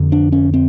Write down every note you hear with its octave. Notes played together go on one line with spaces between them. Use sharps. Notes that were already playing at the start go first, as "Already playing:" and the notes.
Already playing: F2 D3
D4
C#4
C4